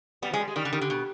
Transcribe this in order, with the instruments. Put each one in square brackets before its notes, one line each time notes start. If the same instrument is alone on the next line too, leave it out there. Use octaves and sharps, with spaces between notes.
[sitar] G3 [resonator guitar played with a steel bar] B3
[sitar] F3
[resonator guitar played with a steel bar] G#3
[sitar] G3
G#3
[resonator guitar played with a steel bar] D#3 [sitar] G3
[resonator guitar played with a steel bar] D3
D#3
D3
B2